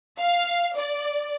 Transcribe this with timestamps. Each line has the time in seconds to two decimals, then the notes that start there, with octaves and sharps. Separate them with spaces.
0.19 F5
0.75 D5